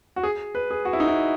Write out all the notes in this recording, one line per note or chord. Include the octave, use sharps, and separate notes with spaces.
F#4
G#4
B4
G#4
F#4
E4
D#4
E4